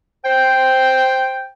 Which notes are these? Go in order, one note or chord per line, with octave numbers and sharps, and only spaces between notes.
C5 G5